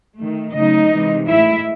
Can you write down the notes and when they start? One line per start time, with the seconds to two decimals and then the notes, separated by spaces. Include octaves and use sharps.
0.18 D#3 A3
0.54 C#3 F#3 A3 D#4 D#5
0.92 C3 E3 G#3
1.29 A2 G#3 E4 E5